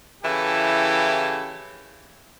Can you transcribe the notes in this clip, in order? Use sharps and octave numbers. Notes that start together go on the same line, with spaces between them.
C#3 E3 E4 G4 A4